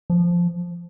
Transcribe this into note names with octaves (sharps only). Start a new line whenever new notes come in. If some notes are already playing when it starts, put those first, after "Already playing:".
F3